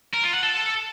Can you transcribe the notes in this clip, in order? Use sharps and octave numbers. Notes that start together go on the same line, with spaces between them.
A#4
F4
F#5
A4